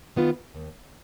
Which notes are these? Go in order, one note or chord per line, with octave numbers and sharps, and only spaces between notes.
D#3 B3 F4 B4
D#2